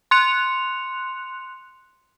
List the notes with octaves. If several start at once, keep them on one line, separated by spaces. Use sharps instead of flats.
C6 F#6 C#7 F7